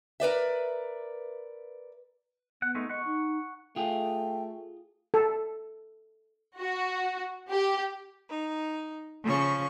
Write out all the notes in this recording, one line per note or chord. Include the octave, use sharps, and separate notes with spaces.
A#4 B4 D5 E5
B3 F#5
G#3 A3 D#4
D#5 F#5 C#6
D#4
A3 F4 G#4 G5
A4
F#4
G4
D#4
C#3 F3 C#4 C#6